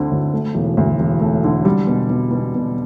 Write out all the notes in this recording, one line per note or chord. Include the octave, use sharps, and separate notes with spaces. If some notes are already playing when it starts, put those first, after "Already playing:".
Already playing: D2 D3 A3 C4
D2
A3
E1
D2
E1
A3
D3
G3
B2
B2
B2
B2